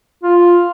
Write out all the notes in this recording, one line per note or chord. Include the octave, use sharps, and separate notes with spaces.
F4